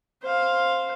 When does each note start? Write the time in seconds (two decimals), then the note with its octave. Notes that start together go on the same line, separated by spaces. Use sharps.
0.23 C5 F5